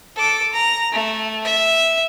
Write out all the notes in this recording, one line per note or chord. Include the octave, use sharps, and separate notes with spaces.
A4 D6
A#5
A3
E5